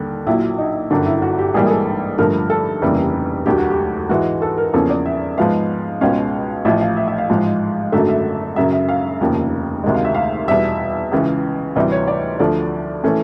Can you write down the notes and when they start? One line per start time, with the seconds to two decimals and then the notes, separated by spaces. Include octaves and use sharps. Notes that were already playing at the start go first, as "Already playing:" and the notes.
Already playing: D#2 D3 G3
0.27 A#1 A#2 F#3 E4
0.58 D#4
0.90 G1 F#2 D3 D4
1.06 E4
1.22 F#4
1.38 G4
1.54 A#1 G#2 E3 G3 A#3 G#4
1.66 G#4
1.70 A4
2.18 G2 D3 F3 A3 A#4
2.50 A4
2.82 F1 D#2 C#3 E3 G3
3.46 E1 D2 D3 F#3 G4
3.58 F#4
3.70 G4
4.09 G#2 E3 G#3 F#4
4.42 A4
4.58 A#4
4.73 E2 C#3 F3 A#3 C#4 A4
4.90 D5
5.06 E5
5.38 G#2 F3 G#3 B3 F5
6.01 C#2 B2 G#3 C#4 F5
6.65 A1 A2 F3 E5
6.81 F5
6.97 E5
7.08 E5
7.18 F5
7.29 A1 G#2 F3 G#3
7.92 G#1 F#2 D3 F#3 A3 E5
8.09 E5
8.56 F#2 C#3 F#3 E5
8.73 E5
8.89 F5
9.20 F1 D#2 C#3 F3
9.84 D2 C3 D#3 G#3
9.94 F5
10.05 E5
10.14 F5
10.48 E2 B2 G3 E5
11.12 C#2 C#3 E3
11.76 D2 C3 E3 G3 D#5
11.92 C#5
12.07 D5
12.39 D2 D3 F3 A3 D5
13.04 E3 A3 C#4